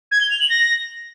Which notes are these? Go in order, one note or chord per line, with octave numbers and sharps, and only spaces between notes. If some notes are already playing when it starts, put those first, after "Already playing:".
G#6
G7
F7
F#7
A#6